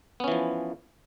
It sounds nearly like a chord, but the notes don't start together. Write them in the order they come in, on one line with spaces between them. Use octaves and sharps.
B3 C#4 E3 F3